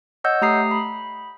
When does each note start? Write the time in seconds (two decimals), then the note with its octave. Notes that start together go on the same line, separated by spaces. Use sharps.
0.24 C#5 D#5 F#5 E6 G6
0.42 A3 G4 A#5 D#6 C7
0.71 B5